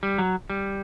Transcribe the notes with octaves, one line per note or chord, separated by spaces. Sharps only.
G3
F#3
G3